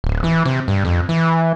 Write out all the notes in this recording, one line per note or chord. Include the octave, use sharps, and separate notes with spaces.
D1
E3
C3
G2
F2
E3